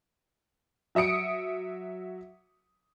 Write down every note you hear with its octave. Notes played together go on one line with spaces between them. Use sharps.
F#3 E5 D#6 C#7 D7